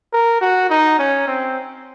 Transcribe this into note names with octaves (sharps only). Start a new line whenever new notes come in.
A#4
F#4
D#4
C#4
C4